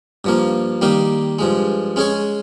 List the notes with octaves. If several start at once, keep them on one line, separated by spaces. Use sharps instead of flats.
G2 F3 A#3
D#3 G3 A#3 D#4
G2 F3 G#3
G#3 C#4 G#4 C#5